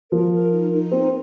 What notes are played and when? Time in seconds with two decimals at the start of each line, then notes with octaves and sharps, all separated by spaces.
0.12 F3 A#4
0.33 A#4
0.52 D#4
0.72 D#4
0.91 C4 A#4